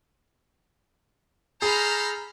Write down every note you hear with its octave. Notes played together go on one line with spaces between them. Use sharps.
G#4 A4 C5 A#5 B5 F6